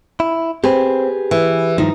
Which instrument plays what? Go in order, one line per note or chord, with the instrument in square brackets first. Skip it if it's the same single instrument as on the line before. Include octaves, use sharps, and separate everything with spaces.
[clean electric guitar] E4
[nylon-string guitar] C4 [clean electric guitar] G4 G#4 B4
[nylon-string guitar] E3
[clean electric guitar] G2 D#3 F3 [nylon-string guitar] D#4